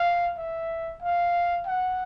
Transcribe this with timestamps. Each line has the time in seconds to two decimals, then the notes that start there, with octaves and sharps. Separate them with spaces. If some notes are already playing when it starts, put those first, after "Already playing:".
Already playing: F5
0.37 E5
1.02 F5
1.66 F#5